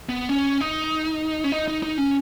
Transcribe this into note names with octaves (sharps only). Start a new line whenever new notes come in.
B3
C#4
D#4
C#4
D#4
D#4
D#4
C#4